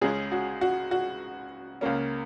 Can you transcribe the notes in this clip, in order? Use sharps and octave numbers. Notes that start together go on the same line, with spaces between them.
C#2 C#3 G#3 C#4 G#4
F#4
F#4
F#4
C#2 C#3 A#3 C#4